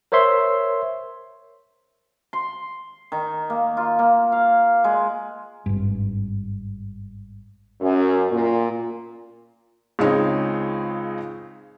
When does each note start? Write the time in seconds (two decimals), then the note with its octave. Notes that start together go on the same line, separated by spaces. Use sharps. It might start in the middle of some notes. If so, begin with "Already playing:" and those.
0.12 A#4 C5 C#5 E5 C6
2.33 C6
3.12 D#3
3.50 A#3
3.77 F4
3.99 A#3
4.32 F5
4.84 G#3
5.66 G#1 G2
7.81 F#2
8.32 A#2
9.99 C#2 C#3 C4 D#4 C#5